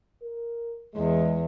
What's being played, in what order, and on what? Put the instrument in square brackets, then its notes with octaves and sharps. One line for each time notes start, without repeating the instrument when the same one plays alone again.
[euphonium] A#4
[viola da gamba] E2 [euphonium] G#3